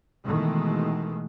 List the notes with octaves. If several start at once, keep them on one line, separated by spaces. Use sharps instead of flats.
B2 D#3 E3 G#3 A3